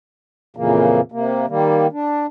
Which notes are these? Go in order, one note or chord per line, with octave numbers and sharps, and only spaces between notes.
F2 A#2 C#3 E3 A#3
C3 A#3
D#3 G3 A#3
D4